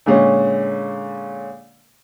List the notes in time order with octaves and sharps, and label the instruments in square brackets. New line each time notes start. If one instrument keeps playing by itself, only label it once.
[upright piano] A#2 D3 G#3 C#4